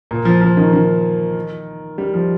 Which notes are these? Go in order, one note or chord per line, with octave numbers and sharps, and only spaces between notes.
A#2
F3
F3
D#3
D#3
G3
F3